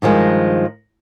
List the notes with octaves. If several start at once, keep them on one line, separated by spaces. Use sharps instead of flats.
G2 D#3 F3 G#3